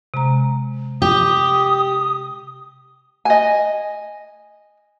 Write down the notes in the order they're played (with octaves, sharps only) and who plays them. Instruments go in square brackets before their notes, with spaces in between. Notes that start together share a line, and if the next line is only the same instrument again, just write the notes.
[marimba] C3 G#3 A#5
[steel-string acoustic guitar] G4 [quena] D#6
[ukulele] D#5 G#5